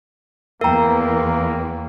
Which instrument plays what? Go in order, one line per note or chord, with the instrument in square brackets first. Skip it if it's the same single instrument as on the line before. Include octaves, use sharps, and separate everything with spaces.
[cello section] E2 B3 [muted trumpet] A#3 [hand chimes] A#4 G5 [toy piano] E5 A#5